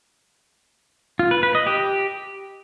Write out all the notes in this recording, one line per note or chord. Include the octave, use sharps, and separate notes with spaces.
F4
B4
B4
D#5
G4